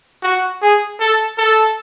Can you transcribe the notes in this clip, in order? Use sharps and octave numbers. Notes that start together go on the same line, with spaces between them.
F#4
G#4
A4
A4